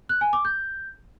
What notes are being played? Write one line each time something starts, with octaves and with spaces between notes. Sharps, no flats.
F#6
G#5
D6
G6